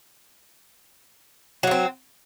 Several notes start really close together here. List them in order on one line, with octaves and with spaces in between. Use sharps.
F#3 A#3 C4